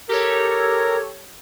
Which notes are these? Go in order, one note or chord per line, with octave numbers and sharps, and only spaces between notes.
G4 A4 A#4 C#5